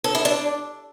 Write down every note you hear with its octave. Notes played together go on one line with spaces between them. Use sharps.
A4
E4
D4